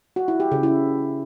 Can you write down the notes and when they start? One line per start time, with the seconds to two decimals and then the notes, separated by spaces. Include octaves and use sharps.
0.16 F#4
0.28 E4
0.40 G4
0.52 C#3
0.63 E4